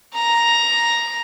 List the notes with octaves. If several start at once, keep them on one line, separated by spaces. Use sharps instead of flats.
A#5